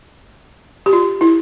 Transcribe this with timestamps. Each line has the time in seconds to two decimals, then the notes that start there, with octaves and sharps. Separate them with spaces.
0.86 G4
0.93 F4
1.21 E4